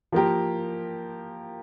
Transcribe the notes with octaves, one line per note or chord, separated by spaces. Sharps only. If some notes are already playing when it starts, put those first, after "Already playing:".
F3 A#3 G4 A#4